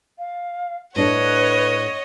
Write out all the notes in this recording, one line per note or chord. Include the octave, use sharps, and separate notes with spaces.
F5
A2 D4 A4 B4 C#5 D#5 F#5